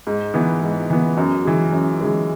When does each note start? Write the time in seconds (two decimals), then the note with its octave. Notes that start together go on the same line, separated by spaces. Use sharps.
0.07 G#2
0.34 E3 B3
0.62 G#2
0.90 E3 B3
1.18 F#2
1.45 E3 G#3
1.73 F#2
2.01 E3 G#3